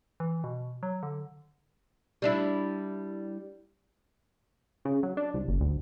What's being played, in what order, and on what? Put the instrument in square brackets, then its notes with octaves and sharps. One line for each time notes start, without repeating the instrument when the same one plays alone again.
[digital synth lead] E3
B2
F#3
D3
[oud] G3 D4 E4
[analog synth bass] C#3
F#3
D4
C2
F#1
D2